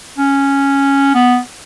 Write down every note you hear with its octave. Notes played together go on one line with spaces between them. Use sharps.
C#4
B3